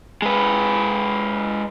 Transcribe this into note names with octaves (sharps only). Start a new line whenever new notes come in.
G#3 B4